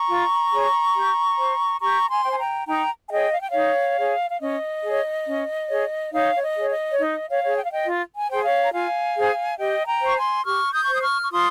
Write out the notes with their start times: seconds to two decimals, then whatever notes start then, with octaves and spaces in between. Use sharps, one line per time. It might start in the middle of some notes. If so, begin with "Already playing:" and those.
Already playing: A#5 C#6
0.09 F4
0.52 G#4 C#5
0.95 G4
1.38 C5
1.81 G4 A#5 C#6
2.10 G#5 C6
2.24 C5 G5
2.31 G#5
2.39 G5 A#5
2.67 D#4 G5 A#5
3.07 G#5
3.11 G#4 C#5 D#5 G5
3.33 F5
3.42 G5
3.51 D#4 C#5 F5
3.98 G#4 C#5
4.31 F5
4.41 C#4 D#5
4.84 G#4 C#5
5.27 C#4
5.70 G#4 C#5
6.13 D#4 C#5 F5
6.35 C#5
6.42 D#5
6.56 G#4 C#5
6.71 D#5
6.92 C#5
6.99 D#4 D#5
7.29 C#5 F5
7.43 G#4 C#5
7.58 G5
7.65 F5
7.72 D#5 G5
7.86 F4
8.17 G#5
8.29 G#4 C5 G5
8.44 C#5 F5
8.63 A#5
8.72 F4 F5 G#5
9.15 G#4 C5
9.58 G4 D#5 G5
9.87 G5 A#5
10.02 C5 C#6
10.17 G#5 C6
10.45 G4 C#6 F6
10.74 D#6 G6
10.84 C5 C#6
10.94 D#6
11.02 C#6 F6
11.23 C#6
11.31 F4 C6 D#6